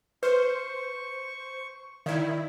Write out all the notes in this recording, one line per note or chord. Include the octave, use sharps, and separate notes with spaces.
B4 C5 C#6
D#3 E4 D5 F5